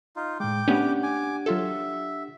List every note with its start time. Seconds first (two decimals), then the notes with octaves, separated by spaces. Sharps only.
0.16 D#4 F4
0.40 A2 G#3 G5 D6
0.68 A3 B3 C#4 D4 G4 F#5
1.03 G#5 D6
1.46 F#3 F4 A4 E5